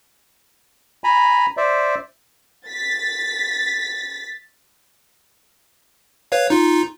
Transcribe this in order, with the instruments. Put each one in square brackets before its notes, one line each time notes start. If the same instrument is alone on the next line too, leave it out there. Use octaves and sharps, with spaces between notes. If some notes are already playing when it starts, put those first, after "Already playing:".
[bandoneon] G#5 A#5 B5
C5 D5 E5
[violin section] A6 B6
[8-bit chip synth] B4 C#5 F5
D#4 F4